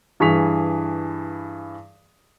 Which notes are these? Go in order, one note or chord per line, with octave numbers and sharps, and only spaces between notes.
G2 E3 G#4 C#6 B6 F7